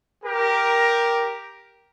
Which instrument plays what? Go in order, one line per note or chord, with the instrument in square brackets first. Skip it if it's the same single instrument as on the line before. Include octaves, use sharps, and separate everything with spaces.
[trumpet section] G4 A#4